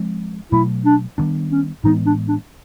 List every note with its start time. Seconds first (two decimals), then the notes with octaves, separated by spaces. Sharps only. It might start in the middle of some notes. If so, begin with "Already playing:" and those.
Already playing: F3 G#3 C4
0.52 B2 F#3 A3 E4
0.85 D4
1.18 D#3 G3 B3 D4
1.51 C#4
1.84 A2 E3 G#3 B3 D#4
2.06 D4
2.28 D4